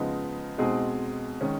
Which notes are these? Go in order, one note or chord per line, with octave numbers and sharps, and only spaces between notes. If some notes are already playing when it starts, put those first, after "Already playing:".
Already playing: C#3 F3 G#3 B3 D#4
B2 G#3 C4 D#4 G#4
D#3 G#3 C#4